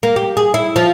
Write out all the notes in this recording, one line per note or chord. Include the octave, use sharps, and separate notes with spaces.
A#3
G4
G#4
E4
F3